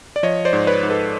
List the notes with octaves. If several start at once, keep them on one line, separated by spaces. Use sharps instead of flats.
D5
F3 C#5 D#5
C5 D5
G#2
B4 C#5
G#2
A4 B4